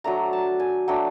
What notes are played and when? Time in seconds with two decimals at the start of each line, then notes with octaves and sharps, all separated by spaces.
0.04 F#3 A3 D4 A#5
0.33 A5
0.60 G#5
0.88 F#3 A3 D4 G5